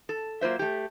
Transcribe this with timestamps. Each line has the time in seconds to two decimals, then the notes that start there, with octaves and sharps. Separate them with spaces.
0.09 A4
0.41 F#3 A#3 F4 C5 E5
0.59 A3 G4